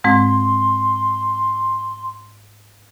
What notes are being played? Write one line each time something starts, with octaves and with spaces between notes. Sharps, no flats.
G#2 G#3 C4 C6